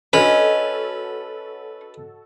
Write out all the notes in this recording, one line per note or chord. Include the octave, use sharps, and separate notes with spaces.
C#4 F#4 A4 B4 D#5